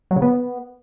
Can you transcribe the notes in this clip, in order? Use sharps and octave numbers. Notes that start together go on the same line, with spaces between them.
F#3
C#3
B3